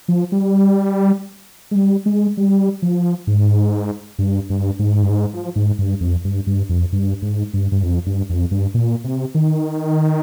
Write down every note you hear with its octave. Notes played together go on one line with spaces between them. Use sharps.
F3
G3
G#3
G3
G#3
G3
F3
G#2
G2
G2
G#2
G2
G#2
F3
G#2
G2
F2
G2
G2
F2
G2
G#2
G2
G2
F2
G2
F2
G2
A#2
C3
D#3